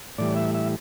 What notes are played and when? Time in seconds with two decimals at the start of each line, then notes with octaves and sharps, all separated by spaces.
0.18 A2 E3 G3 D5
0.36 E5
0.55 E5